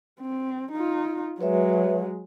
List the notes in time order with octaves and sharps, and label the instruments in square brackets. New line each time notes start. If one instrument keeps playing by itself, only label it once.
[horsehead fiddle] C4
D#4 F4
[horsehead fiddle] F#3 G#3 [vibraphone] B4 C#5 E5